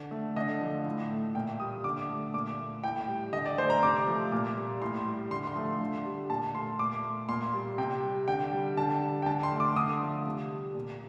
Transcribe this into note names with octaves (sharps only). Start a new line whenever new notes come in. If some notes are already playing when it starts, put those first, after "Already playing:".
Already playing: D3
A3
D3 D#5
F3 A3
A2
A3
A#2 G5
G3 D#6
D3 D6
A3
A#2 D6
A3
A2 G5
G3
D3 D#5
D5
A3 C5
A#5
C3 D6
F3 A3
A#2 D6
G3
A2 C6
G3
D3 C6
C6
F3 A3
D3
G3
A#2 A5
A3 C6
A#2 D6
A3
A#2 C6
G3
C3 G5
G3
D3 G5
G3
D3 A5
G3
G5
D3 A5
C6
A3
D6
D3 D#6
F3 A3
C3
G3
A#2